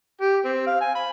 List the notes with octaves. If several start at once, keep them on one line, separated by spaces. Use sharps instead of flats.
G4
C4
F5
G#5
B5